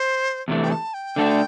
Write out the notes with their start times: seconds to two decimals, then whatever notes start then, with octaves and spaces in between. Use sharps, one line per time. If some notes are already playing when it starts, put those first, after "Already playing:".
Already playing: C5
0.48 E2 C3 E3 A3
0.63 G5
0.71 A5
0.94 G5
1.16 D3 A3 D4 A4